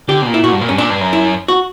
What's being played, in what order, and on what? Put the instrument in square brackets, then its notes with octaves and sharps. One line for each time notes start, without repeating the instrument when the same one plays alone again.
[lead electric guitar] D3 [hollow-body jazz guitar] G4
[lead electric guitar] B2
A#2
[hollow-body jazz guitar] E4
[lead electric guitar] A#2 [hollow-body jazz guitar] F#4
[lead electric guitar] G2
A#2
[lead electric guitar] G2 [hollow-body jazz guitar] C#4
[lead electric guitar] A#2 [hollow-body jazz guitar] D4
[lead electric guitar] G2
F#2
[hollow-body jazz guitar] E4
F#4